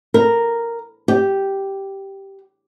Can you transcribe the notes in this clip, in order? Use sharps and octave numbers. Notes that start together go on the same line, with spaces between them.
A#4
G4